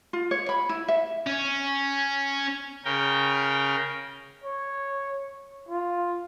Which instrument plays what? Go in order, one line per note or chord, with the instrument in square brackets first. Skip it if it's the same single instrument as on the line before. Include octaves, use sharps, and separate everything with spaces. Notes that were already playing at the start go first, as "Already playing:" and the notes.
[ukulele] F4
C#5
B5
E4
E5
[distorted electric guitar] C#4
[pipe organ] C#3 A#4 G5
[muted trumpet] C#5
F4